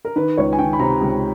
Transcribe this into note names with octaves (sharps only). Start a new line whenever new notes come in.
A#4
D#3 B4
C#2 C#5
G#5
D#3 G5
B5
C3 A#5
C#2